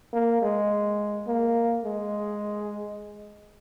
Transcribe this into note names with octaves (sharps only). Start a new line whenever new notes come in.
A#3
G#3
A#3
G#3